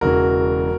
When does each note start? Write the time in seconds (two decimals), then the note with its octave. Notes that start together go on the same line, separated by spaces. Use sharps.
0.01 E1 E2 C#3 E3 F#4 A#4